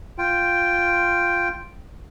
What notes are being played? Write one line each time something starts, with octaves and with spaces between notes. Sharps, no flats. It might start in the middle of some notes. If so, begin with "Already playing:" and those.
F4 G5